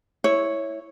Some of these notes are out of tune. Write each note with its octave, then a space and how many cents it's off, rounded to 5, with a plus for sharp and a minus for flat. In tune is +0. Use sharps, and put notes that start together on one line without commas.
E4 -5 C#5 +0